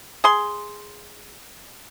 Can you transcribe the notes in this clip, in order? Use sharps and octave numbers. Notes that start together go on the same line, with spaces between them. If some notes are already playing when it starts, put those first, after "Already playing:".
G#4 C6